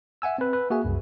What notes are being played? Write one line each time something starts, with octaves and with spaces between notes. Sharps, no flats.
E5 F#5 G#5 E6
C4 B4
B4
A#3 F#4 G#4 E5 G#5
C2 F#2